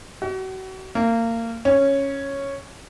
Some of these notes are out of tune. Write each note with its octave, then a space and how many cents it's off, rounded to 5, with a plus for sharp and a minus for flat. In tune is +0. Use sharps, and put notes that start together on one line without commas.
F#4 +35
A#3 -25
C#4 -5